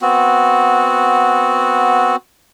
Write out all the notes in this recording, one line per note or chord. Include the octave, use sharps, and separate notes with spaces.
B3 C4 F#4